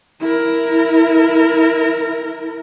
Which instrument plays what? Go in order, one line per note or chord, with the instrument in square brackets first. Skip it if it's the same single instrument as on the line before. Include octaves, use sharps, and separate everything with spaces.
[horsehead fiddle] E4 A#4